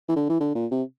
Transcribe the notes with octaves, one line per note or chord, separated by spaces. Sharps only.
E3
D3
E3
D3
A#2
C3